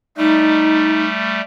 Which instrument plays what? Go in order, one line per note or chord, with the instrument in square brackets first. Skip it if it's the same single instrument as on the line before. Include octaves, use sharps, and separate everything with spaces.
[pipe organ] G3 A3 [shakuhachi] D#4